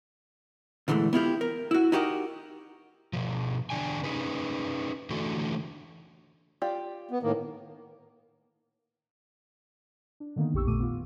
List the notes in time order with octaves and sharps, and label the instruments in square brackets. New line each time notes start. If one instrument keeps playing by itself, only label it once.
[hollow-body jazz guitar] A#2 D3 E3 G#3 A3
B3 E4 F4 G4
A#4
E4 F#4
D#4 E4 F#4 G4 A#4 D#5
[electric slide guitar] B2 F3
E2 G2 D3 D4 G5 G#5
C#4 D#4 G#4 B4
D3 E3 A3 F#4 A4
[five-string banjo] F4 G4 D5
[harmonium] B3
A2 D#3 A#3
[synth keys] D4
D3 D#3 A#3 B3 D#4
A#1 F2 G4 C#6 E6
A1 A#2 A3 D6 D#7
B3 F4